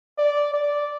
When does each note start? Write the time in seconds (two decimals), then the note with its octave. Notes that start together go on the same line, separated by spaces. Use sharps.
0.18 D5
0.53 D5